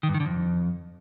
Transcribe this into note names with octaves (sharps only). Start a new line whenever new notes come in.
D#3
G2
D#3
D3
F2